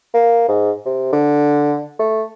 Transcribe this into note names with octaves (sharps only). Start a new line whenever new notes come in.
A#3
G#2
C3
D3
A3